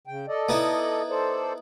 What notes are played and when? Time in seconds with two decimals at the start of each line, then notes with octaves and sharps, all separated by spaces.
0.07 C#3 G5
0.28 A4 D5 D#5
0.49 B3 D#4 E4
1.09 A4 C5 D5